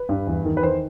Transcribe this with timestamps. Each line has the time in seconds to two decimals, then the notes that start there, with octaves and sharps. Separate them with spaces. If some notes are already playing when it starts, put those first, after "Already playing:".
Already playing: B4
0.09 G2
0.27 E2
0.45 D#3
0.57 B4
0.63 D#3 C5